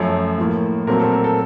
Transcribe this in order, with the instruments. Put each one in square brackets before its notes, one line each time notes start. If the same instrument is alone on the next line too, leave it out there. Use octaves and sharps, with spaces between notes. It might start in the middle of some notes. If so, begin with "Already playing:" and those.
Already playing: [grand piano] F#2 F3 A3 C#5
A2 F3 A#3
A#2 F#3 A3 C4 A#4
A4
A#4
A4